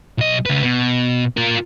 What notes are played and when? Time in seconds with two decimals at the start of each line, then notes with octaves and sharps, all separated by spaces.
0.18 B1 D#5
0.46 C#3 B4
0.64 B2
1.37 F4 A#4